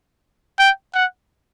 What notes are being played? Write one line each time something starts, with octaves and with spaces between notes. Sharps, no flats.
G5
F#5